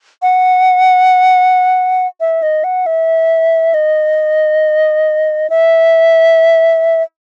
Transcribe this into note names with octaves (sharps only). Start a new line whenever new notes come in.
F#5
E5
D#5
F#5
E5
D#5
E5